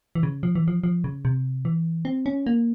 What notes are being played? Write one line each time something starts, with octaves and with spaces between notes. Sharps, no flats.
E3
C#3
F3
E3
F3
F3
C#3
C3
E3
C4
C#4
A#3